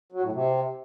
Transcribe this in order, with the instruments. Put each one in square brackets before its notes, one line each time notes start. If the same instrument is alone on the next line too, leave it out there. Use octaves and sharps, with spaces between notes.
[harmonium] F#3
A2
C3